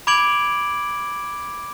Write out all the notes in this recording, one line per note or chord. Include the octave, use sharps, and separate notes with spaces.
B5 D6 G#6 D7 F#7